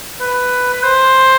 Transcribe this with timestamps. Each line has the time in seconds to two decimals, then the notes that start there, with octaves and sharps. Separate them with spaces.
0.21 B4
0.73 B4
0.84 C5